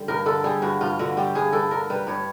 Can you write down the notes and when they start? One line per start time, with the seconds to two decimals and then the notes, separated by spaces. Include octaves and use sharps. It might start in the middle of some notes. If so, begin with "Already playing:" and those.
Already playing: D3 G3
0.08 G2 A#4
0.26 D3 A4
0.44 G3 G#4
0.62 G2 F#4
0.81 G2 F4
0.99 D3 F#4
1.17 G3 G4
1.35 G2 G#4
1.53 G2 A4
1.71 D3 A#4
1.90 G3 B4
2.07 G2 C#5